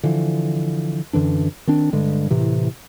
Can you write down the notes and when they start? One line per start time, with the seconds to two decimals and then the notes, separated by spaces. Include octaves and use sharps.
0.03 D3 E3 F3
1.13 F#2 D3 E3 D4
1.67 D#3 C4 D4
1.93 G2 D3 G#3
2.30 A2 C3 E3